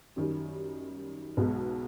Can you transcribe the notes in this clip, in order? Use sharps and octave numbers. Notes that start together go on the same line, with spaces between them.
F#2 D#3 G3
B1 B2 G#3